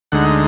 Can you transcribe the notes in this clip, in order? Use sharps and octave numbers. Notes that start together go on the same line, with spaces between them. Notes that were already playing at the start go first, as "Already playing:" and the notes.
D2 D3 G#3 D#4 F#5